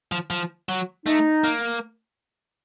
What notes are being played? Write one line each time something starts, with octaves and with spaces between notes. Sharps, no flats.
F3
F3
F#3
A3 D#4
A#3